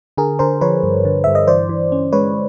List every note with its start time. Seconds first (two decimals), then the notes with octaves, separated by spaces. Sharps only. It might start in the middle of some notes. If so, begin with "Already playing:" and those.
0.17 D3 G#4 A#4
0.39 D3 A#4 C5
0.61 F3 B4 C#5
0.83 G2
1.05 D3
1.24 G2 E5
1.35 D#5
1.48 E3 C5 D5
1.69 E3
1.92 C#4
2.13 G#3 B4 C#5